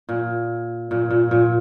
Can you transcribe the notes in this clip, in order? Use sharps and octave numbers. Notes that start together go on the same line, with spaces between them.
A#2
A#2
A#2
A#2